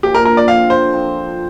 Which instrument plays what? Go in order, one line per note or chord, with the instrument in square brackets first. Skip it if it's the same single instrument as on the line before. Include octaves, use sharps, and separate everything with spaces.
[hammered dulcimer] A#2 F3 A#3 D4 [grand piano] G4
[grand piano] A#4
A#4
D5
[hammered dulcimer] D3 F3 C4 F4 [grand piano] F5
[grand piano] C5
[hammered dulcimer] F3 C4 F4